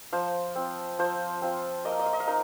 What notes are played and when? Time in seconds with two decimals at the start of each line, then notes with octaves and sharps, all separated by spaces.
0.13 F3 C5 F5
0.56 C4 F4
0.99 F3 C5 F5
1.42 C4 F4
1.85 A#3 D#5
1.92 F5
1.99 D#5
2.06 F5
2.13 D#5
2.20 F5
2.27 D#4 A#4